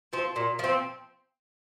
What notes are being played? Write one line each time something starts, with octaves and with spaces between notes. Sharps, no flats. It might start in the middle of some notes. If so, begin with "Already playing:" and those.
F3 C4
A#2
F3 C4